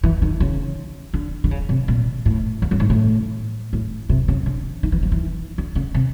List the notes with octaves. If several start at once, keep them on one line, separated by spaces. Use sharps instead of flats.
E3
D#3
C#3
D3
D3
C#3
C3
A#2
A2
E2
F#2
G#2
A2
A2
C3
C#3
D3
D#3
E3
F3
E3
D3
C#3
C3